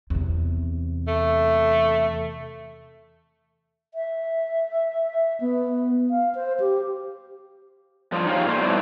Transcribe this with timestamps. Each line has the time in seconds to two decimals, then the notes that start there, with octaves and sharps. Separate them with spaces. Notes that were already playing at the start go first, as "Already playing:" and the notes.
0.10 E2 C3
1.07 A3
3.94 E5
5.40 B3
6.10 F5
6.35 C5
6.60 G4
8.12 G2 F3 F4
8.27 D#4 F4 G4 G#4 C#5 F5
8.46 A#2 A3 C5
8.62 F#3 G3 B3 D4 E4